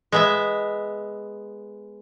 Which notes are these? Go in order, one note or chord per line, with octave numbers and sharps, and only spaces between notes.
G#3 B3 E5